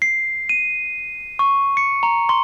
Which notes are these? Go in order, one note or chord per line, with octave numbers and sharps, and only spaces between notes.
C7
D#7
C#6
C#7
A#5
C6